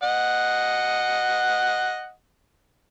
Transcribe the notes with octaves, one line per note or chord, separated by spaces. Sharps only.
D#5 F#5